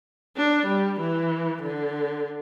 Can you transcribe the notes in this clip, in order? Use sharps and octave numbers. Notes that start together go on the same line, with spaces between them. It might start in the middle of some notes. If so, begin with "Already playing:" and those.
D4
G3
E3
D3